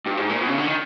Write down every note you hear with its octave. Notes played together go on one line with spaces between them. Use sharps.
G2
G#2
A#2
B2
C#3
D3
D#3